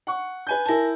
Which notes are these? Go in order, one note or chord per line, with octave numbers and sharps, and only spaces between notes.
F#5 C#6
B4 G#5 G6
E4 A#4 G#5 A5